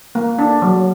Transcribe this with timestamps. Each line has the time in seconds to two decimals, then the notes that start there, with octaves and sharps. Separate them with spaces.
0.15 A#3
0.39 D4
0.62 F#3